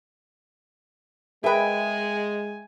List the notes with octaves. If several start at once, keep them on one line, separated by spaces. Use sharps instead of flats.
G#3 G#4 A#4 B4 E5 G5 G#5